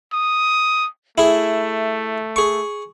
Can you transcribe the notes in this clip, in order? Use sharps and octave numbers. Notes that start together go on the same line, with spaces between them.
D#6
A3 E4 G#4
G#4 C#6